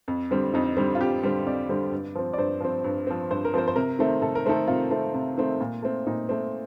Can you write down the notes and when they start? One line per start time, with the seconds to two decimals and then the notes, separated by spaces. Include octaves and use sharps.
0.08 F2
0.31 D3 G3 C4
0.54 F2 D#4
0.77 D3 G3 C4
0.95 F4
1.00 F2 G4
1.23 D3 G3 C4
1.46 F2 D5
1.69 D3 G3 C4
1.92 G2
2.15 F3 C4
2.33 D5
2.38 G2 C5
2.61 F3 C4
2.84 G2
3.07 F3 C4
3.30 G2 C5
3.45 A#4
3.54 F3 C4 C5
3.68 C5
3.76 C3 A#4
3.99 D#3 A3 C4
4.22 C3 A4
4.35 A#4
4.46 D#3 A3 C4 A4
4.67 C3 F4
4.91 D#3 A3 C4
5.14 C3
5.37 D#3 A3 C4
5.61 A#2
5.82 A3 C4
6.07 A#2 D#4
6.29 A3 C4